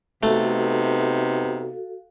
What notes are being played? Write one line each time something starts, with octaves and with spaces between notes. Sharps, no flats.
C3 A3 B3 D#4 F#4 A4 F5